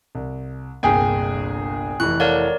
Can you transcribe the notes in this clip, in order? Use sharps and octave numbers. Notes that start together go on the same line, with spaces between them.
C2
G1 C2 A#2 G#4 G5 G#5
F1 E3 C#6 F#6
A4 A#4 C#5 D5 F5 F#5